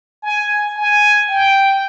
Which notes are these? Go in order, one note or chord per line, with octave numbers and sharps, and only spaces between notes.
G#5
G#5
G5